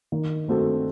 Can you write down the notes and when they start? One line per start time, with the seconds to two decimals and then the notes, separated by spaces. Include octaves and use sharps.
0.12 D#3
0.48 A3 C4 F#4 A4